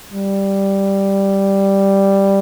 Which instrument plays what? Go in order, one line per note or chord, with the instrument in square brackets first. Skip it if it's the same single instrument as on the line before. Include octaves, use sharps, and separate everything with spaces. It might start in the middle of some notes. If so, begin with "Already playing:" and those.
[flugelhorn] G3